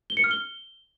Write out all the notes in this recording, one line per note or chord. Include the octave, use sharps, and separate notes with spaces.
G7
C#7
F6
G7